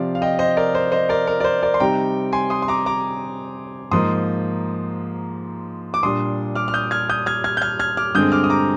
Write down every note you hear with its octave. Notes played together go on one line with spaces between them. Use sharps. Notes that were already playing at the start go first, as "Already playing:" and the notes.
Already playing: C3 F3 C4 D5 F5
F5
D#5 G5
C5 D#5
A#4 D5
C5
C5 D#5
A#4 D5
A#4
D5
C5
A#4 D5
C6
C3 G3 C4 D#4 G5 A#5
G#5 C6
C6 D#6
C6
A#5 D6
A#5 D6
G#2 F3 A#3 D#4 C6 D#6
D6
A#2 G3 D4 C6 D#6
D6 F6
F6
D#6 G6
F6 G#6
D#6 G6
F6 G#6
F6 G#6
G6
F6 G#6
F6 G#6
D6 F6
G2 D3 G#3 C4 D#6 G6
D6 F6
D#6
A#5 D6